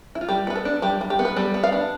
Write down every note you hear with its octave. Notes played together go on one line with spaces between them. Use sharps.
E4
F4
G3 G4
B3 B4
A4
D4
G3 G4
G3
G4
B3
B4
G3 A4
B3
F5
D4